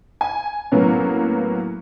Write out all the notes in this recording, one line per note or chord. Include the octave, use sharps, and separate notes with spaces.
G#5
A2 F#3 A#3 B3 C#4